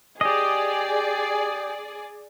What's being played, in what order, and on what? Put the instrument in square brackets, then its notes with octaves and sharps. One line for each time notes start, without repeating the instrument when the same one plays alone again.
[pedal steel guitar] G4 D#5 [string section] G#4 D5